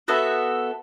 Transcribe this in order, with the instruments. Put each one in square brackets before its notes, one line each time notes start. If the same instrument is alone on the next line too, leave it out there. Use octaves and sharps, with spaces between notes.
[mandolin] B3 F#4 A4 E5